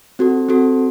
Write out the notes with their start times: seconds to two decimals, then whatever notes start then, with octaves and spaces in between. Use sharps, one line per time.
0.19 C4 F#4 A4
0.49 C4 F#4 A4